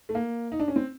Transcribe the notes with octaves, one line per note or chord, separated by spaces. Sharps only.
A3
A#3
D#4
D4
C#4
C4